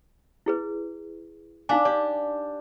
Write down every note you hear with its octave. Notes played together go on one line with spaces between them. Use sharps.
E4 G#4 B4
D4 D#4 F5 G#5
G4 D5